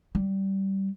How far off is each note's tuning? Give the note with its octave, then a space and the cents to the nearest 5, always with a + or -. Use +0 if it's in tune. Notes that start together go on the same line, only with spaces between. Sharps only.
G3 -15